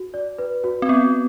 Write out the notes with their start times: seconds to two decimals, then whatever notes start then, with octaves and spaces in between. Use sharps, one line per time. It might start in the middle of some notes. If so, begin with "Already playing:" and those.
Already playing: F#4
0.14 D5
0.38 B4
0.64 F#4
0.82 C4
0.89 B3 F#4